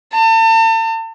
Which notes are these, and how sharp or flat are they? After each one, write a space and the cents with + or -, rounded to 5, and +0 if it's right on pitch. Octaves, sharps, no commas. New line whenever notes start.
A5 +40